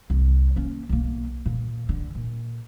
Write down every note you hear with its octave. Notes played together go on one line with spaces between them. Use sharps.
C2
A#3 C#4
B1 A#3
A#2
D3
A#2